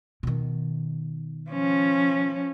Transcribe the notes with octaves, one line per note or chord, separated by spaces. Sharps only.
B2 D#3
F3 C#4